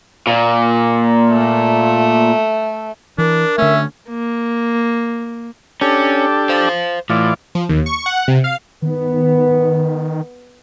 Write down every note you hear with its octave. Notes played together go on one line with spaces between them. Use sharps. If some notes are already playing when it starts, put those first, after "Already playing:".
A#2
A3
E3 D4 A#4
D3 A3 C#4 E5
A#3
C#4 D4 G4 A4
C5 F5
A2 E3 F4 D5
F3
D#2
C#6
F#5
C3
F5
D#3 B3